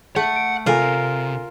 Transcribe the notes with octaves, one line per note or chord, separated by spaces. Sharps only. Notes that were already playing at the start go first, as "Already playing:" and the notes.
A3 F#5
D7
C3 F4 A4 A#4 G#5